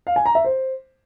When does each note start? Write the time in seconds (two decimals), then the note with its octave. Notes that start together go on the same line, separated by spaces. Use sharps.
0.07 F5
0.16 G#5
0.26 A#5
0.35 E5
0.45 C5